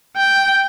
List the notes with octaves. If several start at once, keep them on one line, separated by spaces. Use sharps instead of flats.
G5